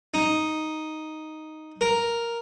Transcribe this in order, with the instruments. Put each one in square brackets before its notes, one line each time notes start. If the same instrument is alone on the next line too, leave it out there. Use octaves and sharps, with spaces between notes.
[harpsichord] D#4
A#4